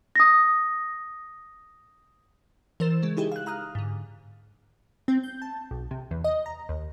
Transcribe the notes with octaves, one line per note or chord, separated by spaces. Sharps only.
D#6 A#6
E3 A#4 C5 A6 E7
C#3 G#3
D#4 E4 G4 G#4
F5 F#6
F5 A#5 D#6 F6 F#6
G#2 D3
C4
G6
A5
B1
C3
E2
D#5
A#5
D#2